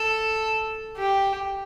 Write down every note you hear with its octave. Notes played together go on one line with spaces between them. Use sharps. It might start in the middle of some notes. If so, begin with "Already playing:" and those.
Already playing: A4
G4